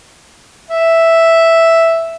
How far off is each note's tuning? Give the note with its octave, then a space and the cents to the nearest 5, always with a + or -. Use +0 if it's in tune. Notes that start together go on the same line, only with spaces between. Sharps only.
E5 +0